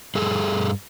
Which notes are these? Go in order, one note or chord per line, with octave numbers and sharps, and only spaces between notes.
G2 G#4 A4